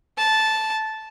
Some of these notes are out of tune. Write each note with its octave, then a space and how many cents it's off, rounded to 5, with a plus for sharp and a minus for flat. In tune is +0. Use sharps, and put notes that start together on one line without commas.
A5 -10